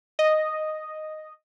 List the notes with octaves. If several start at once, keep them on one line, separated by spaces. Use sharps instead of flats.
D#5